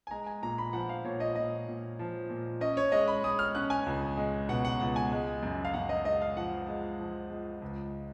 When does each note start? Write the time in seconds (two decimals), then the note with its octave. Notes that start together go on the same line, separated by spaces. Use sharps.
0.07 G#5
0.11 G#3 A#5
0.27 G#5
0.42 A#2 A#5
0.58 B5
0.73 F3 F#5
0.89 F5
1.05 A#2 C#5
1.20 D#5
1.36 A#2 D#5
1.68 A#2
1.99 F3
2.30 A#2
2.61 C#4 D#5
2.77 C#5
2.92 G#3 D#5
3.08 B5
3.24 G#3 D#6
3.39 F6
3.55 C#4 F#6
3.70 G#5
3.86 C#2
4.17 G#3
4.49 B2 F#5
4.65 F#5
4.80 C#2 F#5
4.96 G#5
5.12 G#3
5.43 F#2
5.65 F5
5.74 F#2 F#5
5.89 D#5
6.05 G#3 D#5
6.22 F5
6.37 F3 F#5
6.68 G#3
6.99 F3
7.30 G#3
7.62 C#2